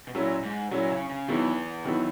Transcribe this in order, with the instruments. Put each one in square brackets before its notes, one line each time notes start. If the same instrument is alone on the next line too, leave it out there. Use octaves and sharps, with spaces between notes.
[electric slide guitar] B2
[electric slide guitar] A#2 [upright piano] F#3 C#4 E4
[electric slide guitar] G#2
[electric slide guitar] A#2 [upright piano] F#3 C#4 E4
[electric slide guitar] C#3
C#3
[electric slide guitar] E2 E3 [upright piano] D#3 F#3 B3 E4
[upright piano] D#3 F#3 B3 E4